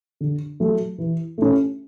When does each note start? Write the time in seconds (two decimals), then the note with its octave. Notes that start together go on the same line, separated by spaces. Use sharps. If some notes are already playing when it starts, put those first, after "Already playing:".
0.20 D3
0.60 F#3 A3
0.98 E3
1.38 A3 C#4